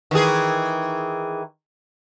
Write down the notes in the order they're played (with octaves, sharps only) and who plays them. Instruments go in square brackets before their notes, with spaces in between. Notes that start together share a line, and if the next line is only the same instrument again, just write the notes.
[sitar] D#3 E3 G#4